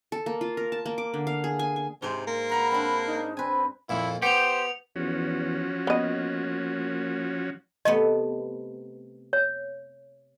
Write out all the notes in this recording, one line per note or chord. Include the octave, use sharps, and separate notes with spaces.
A4
A#3
F4
A#4
A5
A#3
D6
D3
F5
G#4
G#5
G#5
G#2 C3 C5
A#3
B4 F#5 A#5 C6
C4 D4 B5
D#4
C4 B4 G#5
F2 A#2 E4
B3 G4 C5 C#7 F7
E2 F3 C#4 F#4
A#3 B3 D#5
C3 A3 B3 D#5
C#5